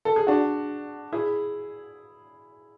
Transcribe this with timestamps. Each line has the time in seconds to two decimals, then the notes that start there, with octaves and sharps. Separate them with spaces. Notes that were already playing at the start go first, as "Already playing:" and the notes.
0.05 A4
0.16 G#4
0.27 D4 F#4
1.12 E4 G#4